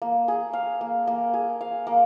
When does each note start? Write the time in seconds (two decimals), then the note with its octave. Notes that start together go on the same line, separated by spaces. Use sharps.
0.02 A#3
0.28 G#4
0.53 F5
0.81 A#3
1.07 A#3
1.34 G#4
1.61 F5
1.87 A#3